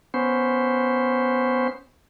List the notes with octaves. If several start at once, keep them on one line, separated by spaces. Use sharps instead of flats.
B3 C#4 C5